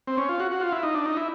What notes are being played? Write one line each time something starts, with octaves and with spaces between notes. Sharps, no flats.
C4
C#4
F4
F#4
F#4
F4
E4
D#4
D4
D#4
E4